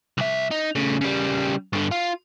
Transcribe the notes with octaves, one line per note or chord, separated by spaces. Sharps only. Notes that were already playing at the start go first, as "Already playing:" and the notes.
C2 E5
D#4
C#3 A3
C#3 G3
G2 D3
F4